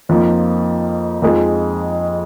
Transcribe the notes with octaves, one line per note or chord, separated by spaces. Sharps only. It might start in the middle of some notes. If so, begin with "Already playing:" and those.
F2 F3 A#3 D#4
F2 F3 G#3 D#4 G#4